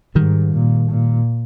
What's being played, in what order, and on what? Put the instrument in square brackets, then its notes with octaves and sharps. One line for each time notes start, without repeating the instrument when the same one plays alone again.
[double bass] G#2 [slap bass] D#3 G3
[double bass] A#2
A#2